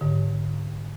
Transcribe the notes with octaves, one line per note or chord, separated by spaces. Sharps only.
G#2 D3